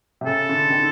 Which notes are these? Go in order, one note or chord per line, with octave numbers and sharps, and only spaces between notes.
C3
C#3 A4
D3
D#3